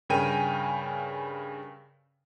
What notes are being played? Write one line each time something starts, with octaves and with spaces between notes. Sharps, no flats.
G2 C#3 A#4 G5 G#5 D#7